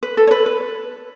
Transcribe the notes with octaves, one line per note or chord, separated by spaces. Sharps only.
B4
A4
C#5
B4
B4